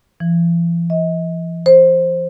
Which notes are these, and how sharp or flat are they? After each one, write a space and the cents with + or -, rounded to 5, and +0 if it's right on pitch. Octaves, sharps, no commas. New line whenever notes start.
E3 +45
D#5 +40
C5 +10